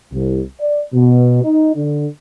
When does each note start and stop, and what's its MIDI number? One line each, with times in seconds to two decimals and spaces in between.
0.12 0.42 36
0.60 0.81 74
0.94 1.42 47
1.44 1.73 63
1.75 2.06 50